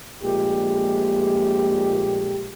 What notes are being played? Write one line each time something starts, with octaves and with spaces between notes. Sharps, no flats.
A#1 A#2 G#3 A3 G4